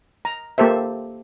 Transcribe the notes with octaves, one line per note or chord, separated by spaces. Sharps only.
A#5
A#3 G4 A4 C5 E5